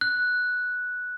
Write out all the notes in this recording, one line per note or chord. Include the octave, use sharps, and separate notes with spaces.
F#6